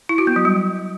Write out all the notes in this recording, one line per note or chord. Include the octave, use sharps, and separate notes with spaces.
E4
F#4
B3
F#3
G3